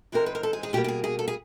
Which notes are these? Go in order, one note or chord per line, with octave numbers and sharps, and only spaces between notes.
G#2 E3 G#3 C4 A#4
B4
A#4
A4
G#4
G#4
B2 G3 A#3 G4
G4
G#4
G#4
A4
G#4